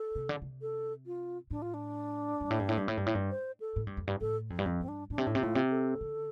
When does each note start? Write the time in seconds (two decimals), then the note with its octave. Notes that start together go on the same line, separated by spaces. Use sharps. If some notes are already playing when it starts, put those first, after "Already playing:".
Already playing: A4
0.15 C3
0.29 D3
0.42 C3
0.62 A4
1.06 F4
1.51 A2 D4
1.62 F4
1.74 D4
2.41 G2
2.50 A2
2.59 G2
2.69 A2
2.77 G2
2.88 A2
2.97 G2
3.06 A2
3.15 G2
3.31 C5
3.60 A4
3.76 A2
3.87 G2
3.97 F2
4.07 G2
4.21 A2 A4
4.50 F2
4.59 G2
4.65 F2
4.81 G2 C4
4.88 D4
5.10 A2 D4
5.18 C3
5.27 A2
5.35 C3 D4
5.40 A2 F4
5.55 C3
5.71 A4
6.01 D3